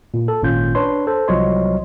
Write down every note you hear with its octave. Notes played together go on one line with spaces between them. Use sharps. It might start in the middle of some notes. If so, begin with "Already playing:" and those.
A#2
A4
G#1 A#2 C#4 F4 G6
D4 B4 C#5 C6
A4 C5
C2 F3 F#3 C#5 D#5 C6